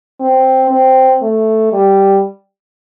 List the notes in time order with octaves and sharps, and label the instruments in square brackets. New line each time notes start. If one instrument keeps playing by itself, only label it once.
[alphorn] C4
C4
A3
G3